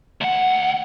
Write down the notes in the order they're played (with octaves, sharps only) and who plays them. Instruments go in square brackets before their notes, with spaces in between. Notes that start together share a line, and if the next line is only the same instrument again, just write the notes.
[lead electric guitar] D2 F#5